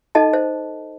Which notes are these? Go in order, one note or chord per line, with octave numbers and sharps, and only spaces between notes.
D#4 A4 D#5 A5
C5